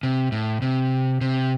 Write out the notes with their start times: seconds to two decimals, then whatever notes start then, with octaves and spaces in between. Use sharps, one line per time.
0.03 C3
0.32 A2
0.62 C3
1.21 C3